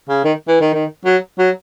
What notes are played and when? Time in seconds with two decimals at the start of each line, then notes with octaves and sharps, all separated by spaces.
0.09 C#3
0.24 D#3
0.48 E3
0.60 D#3
0.73 D#3
1.05 F#3
1.38 F#3